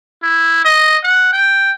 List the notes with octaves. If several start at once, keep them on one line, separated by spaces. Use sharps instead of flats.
E4
D#5
F#5
G5